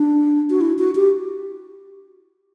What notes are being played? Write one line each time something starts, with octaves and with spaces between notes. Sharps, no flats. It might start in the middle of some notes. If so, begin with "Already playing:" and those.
Already playing: D4
F#4
E4
F#4
G4